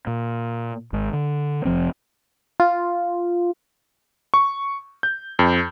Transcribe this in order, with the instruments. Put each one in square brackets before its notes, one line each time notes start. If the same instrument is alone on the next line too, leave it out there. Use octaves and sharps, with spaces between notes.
[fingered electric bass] A#2
G#1 G#2
D3
F1 F3 C4
[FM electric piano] F4
[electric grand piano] C#6
G6
F2